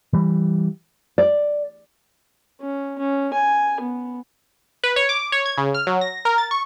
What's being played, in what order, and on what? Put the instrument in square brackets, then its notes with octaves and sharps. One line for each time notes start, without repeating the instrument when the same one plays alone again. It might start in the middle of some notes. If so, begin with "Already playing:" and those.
[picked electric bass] E3 G3
[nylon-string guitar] D5
[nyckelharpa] C#4
C#4
G#5
B3
[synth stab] B4
C#5
D6
C#5
G#6
C#3
F6
F#3
A#6
A#4
A6
C#6